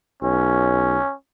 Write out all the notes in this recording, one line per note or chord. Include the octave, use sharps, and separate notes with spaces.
B1 C#4